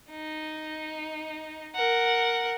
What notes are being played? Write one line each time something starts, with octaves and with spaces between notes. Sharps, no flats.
D#4
A#4 F#5